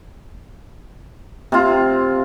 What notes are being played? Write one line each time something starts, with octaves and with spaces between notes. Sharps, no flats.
C3 F4